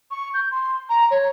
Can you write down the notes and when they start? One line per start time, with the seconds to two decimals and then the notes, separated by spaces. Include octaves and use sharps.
0.11 C#6
0.34 G6
0.51 C6
0.89 A#5
1.11 C#5